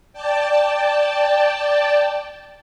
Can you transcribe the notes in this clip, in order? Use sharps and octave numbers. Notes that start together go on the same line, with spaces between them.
D5 G5 A5